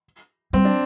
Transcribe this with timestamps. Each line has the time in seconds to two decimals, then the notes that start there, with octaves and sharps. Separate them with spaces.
0.53 G3 C4
0.65 D4